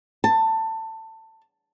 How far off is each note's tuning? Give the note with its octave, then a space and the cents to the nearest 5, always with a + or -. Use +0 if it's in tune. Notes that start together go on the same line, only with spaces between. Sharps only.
A5 +20